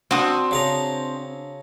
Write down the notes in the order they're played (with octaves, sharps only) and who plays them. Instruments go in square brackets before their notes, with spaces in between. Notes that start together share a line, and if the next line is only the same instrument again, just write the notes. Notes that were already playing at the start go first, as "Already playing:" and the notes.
[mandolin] C4 D#6 [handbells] D4 E6 [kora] F#4
[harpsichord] C#3 A5 A#5